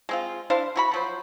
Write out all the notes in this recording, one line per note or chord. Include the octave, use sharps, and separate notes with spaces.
G#3 C4 F4
D4 E4 C5 F5
E4 F#4 B5
F3 F#3 C5